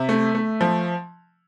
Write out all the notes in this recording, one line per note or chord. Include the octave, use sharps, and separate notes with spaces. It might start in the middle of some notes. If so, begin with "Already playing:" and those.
Already playing: C3 E5
A3
A3
F3